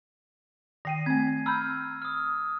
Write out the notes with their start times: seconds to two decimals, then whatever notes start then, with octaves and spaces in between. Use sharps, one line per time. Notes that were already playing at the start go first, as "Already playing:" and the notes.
0.85 D#3 G5 A#6 C7 D#7
1.06 A3 C4 G#6
1.46 A#5 B5 E6 F6 G6
2.02 D#6 F6